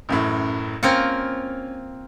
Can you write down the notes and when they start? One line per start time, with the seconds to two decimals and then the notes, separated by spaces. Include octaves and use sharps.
0.09 A1 F#2 A2
0.83 A#3 C4 C#4 F4 C#7